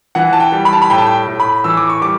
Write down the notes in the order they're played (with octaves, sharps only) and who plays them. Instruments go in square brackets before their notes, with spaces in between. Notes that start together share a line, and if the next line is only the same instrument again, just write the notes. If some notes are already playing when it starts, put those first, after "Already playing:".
[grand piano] E3 F#5
A5
G5
G3
B5
A5
B5
A2 G5
A5
G5
A2
B5
E3 E6
D6
C#6
G3 D6